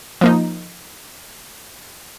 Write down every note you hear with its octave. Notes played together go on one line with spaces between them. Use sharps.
F3 A#3 D#4